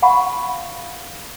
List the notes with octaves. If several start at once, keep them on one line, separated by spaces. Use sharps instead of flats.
F5 F#5 A5 B5 C#6